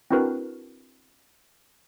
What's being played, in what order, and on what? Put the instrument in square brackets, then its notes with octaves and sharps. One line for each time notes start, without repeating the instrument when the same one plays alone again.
[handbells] C4 D4 E4 F#4 A#4 B4